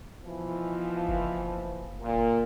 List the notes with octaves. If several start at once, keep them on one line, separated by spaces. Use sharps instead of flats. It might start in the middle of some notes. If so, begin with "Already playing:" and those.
B2 E3 F3
F#1
A#2